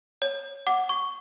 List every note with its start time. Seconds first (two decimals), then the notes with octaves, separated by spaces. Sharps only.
0.22 C#5
0.67 F#5 D6
0.89 C#6